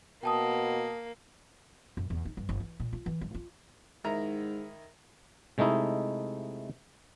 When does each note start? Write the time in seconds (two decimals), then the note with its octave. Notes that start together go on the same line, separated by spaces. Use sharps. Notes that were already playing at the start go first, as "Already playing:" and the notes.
0.23 B2 A#3 G5 A5 D#6
1.97 F#2
2.10 E2
2.25 D#4
2.37 G2
2.49 G1
2.60 E3
2.80 A#2
2.93 F4
3.06 E3
3.21 G2
3.35 F4
4.04 G#2 D#3 E4 A#5
5.58 C3 G#3 A3 D#4 E4